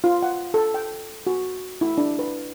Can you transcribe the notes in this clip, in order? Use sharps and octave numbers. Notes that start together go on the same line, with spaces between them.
F4
F#5
A4
G5
F#4
E4
D4
B4